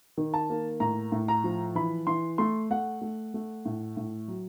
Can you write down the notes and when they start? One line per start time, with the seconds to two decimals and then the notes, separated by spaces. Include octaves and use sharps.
0.18 D#3
0.34 A5
0.50 A#3
0.80 A2 A#5
1.12 A2
1.28 A#5
1.44 F3
1.75 E3 B5
2.07 E3 C6
2.38 A3 C6
2.71 A3 F#5
3.01 A3
3.34 A3
3.66 A2
3.97 A2
4.28 F#3